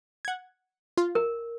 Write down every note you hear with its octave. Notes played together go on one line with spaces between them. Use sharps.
F#5 G#6
F4
A#4